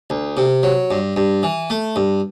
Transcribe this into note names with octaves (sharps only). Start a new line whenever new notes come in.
D2
C3
F#3
G2
G2
E3
A3
G2